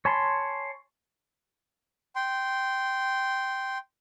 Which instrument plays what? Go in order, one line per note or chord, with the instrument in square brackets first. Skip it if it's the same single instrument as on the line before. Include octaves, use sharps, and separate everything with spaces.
[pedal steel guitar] C#5 G#5 A5 B5 C6
[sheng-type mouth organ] G5 C6